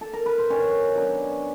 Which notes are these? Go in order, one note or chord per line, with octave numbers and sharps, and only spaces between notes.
A4
A#4
B4
C5
D#3 C#4 C#5
F#3 B3 D4